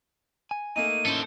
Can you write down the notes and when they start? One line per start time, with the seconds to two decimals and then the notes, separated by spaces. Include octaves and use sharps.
0.51 G#5
0.76 A3 A#3 D#4 D#7
1.06 A2 C#4 E4 A4 C5